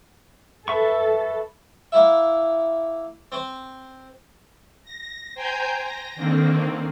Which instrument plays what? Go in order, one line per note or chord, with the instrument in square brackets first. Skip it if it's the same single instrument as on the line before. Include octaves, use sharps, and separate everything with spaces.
[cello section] A4 [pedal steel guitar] B4 E5 C#6
[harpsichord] A#3 E4 E5
C4 C5
[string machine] A#6
C5 G5 G#5 A#5 G6
A#6
D3 D#3 A#3 C4